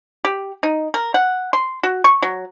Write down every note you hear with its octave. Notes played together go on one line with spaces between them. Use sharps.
G4
D#4
A#4
F#5
C6
F#4
C#6
F#3